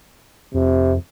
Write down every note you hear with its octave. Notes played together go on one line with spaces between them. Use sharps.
F2 C3